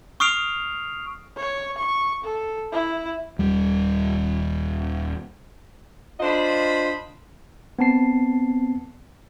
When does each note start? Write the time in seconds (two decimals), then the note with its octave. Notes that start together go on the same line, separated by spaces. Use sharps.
0.20 C#6 D#6 F6 C7 D7 F7
1.36 C#5
1.78 C#6
2.23 A4
2.72 E4
3.39 D#1 G3
6.20 D4 F4 C5 D#5 B5
7.79 B3 C4 A5 C7